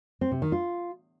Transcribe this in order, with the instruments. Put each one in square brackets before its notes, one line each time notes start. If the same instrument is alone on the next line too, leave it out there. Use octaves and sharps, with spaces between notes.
[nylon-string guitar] C4
C3
D#3
F4